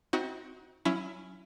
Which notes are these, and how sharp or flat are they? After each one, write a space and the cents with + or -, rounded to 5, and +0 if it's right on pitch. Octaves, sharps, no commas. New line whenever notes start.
C4 +0 D#4 +40 F#4 +0
F#3 +0 C#4 +0 E4 +15